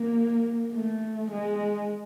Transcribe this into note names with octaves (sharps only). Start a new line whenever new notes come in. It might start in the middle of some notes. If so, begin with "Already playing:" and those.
Already playing: A#3
A3
G#3